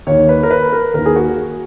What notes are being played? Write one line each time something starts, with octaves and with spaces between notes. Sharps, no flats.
D#2 D#3 C#5
B4
A#4
B4
A#4
D#2 D#3 A#4
G#4
F#4